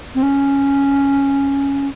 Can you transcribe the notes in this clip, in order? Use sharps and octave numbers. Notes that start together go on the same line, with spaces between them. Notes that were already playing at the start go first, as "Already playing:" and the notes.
C4
C#4